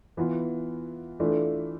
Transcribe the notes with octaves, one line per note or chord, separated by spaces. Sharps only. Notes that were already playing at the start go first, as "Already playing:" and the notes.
E3 B3 F4
E3 A3 D4 F4